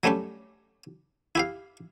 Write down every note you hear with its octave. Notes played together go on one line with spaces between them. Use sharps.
F#3 G3 A3 C#4 G4
E4 G4 F5